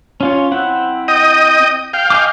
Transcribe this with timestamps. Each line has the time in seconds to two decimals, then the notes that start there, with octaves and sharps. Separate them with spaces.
0.21 C#4 F4 C#5
0.51 C4 E4 F#5
1.08 D#5 G5 D#6
1.93 F5 G5
2.10 D#5 G#5 D6